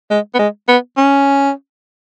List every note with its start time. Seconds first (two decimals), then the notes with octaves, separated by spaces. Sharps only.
0.10 G#3
0.34 B3
0.39 G#3
0.68 B3
0.97 C#4